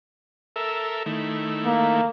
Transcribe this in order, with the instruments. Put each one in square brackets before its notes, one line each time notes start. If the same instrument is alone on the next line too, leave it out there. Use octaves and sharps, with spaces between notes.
[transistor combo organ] A4 A#4 E5
D#3 A3 E4
[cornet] A#3